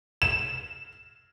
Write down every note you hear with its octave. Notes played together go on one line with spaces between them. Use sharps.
E7